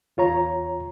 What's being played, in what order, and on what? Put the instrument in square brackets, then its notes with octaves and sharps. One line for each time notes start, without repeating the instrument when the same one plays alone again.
[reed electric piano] E2 F4 C#5 A#5